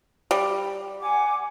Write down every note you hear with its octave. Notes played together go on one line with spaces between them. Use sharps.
G3
F#5 G#5 D6